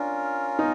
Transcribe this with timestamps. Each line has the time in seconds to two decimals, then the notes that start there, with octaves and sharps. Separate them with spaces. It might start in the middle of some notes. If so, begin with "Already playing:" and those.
Already playing: C#4 D4 F4 A#4
0.59 D#4